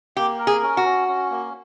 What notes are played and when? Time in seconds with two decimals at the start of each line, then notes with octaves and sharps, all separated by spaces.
0.17 A#3 G4
0.39 A#4
0.47 G#4
0.62 C#4
0.77 F#4
0.84 C#4
1.08 C#4
1.30 A#3